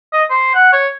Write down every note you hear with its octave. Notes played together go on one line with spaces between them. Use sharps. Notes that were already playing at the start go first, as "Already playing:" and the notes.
D#5
C5
F#5
C#5